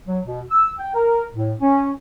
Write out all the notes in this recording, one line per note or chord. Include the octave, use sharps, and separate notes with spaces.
F#3
B2
E6
G5
A#4
A2
C#4